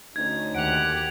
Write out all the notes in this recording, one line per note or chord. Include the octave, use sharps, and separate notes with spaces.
D2 C#4 D#4 G#6
D#2 G4 F#5 D7 F7